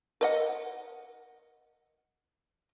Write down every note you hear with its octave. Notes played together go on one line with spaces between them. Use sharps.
A#4 D#5 F#5